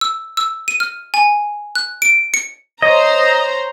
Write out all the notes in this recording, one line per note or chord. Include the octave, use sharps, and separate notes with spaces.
E6
E6
D#7
F6
G#5
F#6
D7
C#7
C5 C#5 D#5 A#5